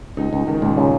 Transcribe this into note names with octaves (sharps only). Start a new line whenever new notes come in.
C#2 D#4
C#2
C#2 D#3
C#2 A#2
C#3